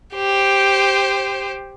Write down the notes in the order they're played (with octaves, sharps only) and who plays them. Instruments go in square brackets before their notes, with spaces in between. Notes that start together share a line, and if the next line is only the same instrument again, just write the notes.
[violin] G4 C5